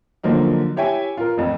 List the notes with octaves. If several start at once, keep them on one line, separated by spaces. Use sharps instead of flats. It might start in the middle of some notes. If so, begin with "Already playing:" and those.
D3 F3 F#3 A#3 D#4
E4 G4 C#5 E5 G5 G#5
F4 A#4
A1 F2